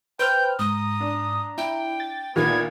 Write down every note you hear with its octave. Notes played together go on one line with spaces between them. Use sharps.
B4 C5 G5 F6 G6
G#2 A#5 D#6
D4
E4 G5
A6
D2 A#2 D#3 B3 G#6